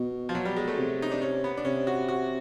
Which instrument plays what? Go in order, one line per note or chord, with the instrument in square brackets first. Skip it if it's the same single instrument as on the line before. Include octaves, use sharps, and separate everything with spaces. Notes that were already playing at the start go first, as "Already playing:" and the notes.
Already playing: [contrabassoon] B2
[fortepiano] F3
[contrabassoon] B2 [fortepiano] F#3
[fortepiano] G3
G#3
A3
[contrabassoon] C3
[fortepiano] D#4
D4
C#4
B3
D4
[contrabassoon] C3 [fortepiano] C#4
[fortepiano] F#4
F#4